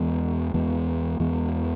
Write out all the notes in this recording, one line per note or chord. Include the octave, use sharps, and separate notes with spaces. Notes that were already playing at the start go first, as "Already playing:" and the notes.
Already playing: E2 E3 G#3 B3
E2 E3 G#3 B3
E2 E3 G#3 B3